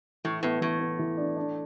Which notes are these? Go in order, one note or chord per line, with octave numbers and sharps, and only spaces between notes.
A2 E3
A2 B3
A2 E3
B3
E3
D4
D4